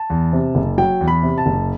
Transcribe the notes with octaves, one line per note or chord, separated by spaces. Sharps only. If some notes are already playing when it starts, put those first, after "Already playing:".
Already playing: A5
E2
C3
F#1
F#3 G5
E2
B5
C3
A5
F#1